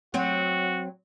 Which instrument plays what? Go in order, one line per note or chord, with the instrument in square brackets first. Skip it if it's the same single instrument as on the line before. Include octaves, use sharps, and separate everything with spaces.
[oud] F#3 C4 [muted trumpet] F#4